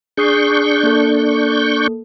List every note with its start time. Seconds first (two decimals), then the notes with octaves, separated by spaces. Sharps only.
0.18 D4 G#4 C#6 D#6 G6 C7
0.83 A#3 A4